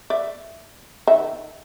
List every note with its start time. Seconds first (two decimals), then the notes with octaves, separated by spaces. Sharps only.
0.10 D5 E5
1.07 D#3 E5